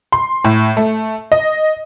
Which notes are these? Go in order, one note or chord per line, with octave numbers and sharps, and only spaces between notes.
C6
A2
A3
D#5